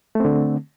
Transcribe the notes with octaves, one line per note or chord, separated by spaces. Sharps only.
D3 A3 C4